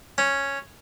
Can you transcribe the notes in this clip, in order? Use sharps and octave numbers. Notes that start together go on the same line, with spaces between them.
C#4